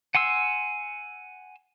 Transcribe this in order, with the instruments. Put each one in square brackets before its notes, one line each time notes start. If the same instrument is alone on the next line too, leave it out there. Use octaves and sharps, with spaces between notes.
[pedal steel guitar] F#5 G#5 C6 E6